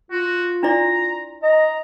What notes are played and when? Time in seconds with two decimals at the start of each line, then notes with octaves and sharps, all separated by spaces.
0.11 F4 F#4
0.63 D4 E4 D5 A#5
1.43 D#5 A#5